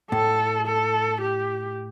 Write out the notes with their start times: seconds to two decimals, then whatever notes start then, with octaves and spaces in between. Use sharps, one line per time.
0.11 A2 A4
0.67 A4
1.21 G4